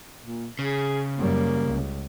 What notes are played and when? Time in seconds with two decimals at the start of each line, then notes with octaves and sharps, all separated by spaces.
0.24 A#2
0.59 C#3 G#4
1.18 F#2 G3 A#3
1.67 C#2